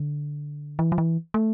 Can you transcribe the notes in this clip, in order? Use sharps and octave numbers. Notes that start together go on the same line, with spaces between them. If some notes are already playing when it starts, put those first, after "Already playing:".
Already playing: D3
E3
F3
E3
A3